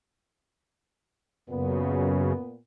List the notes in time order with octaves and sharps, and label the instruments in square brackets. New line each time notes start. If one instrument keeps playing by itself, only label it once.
[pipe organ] F#2 C#3 [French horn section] A#2 B3